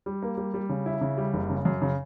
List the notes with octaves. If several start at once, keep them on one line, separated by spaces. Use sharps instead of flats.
G3
A#3
G3
G3
C#3
E4
C#3
G3
F#1
C#3
F#2
C#3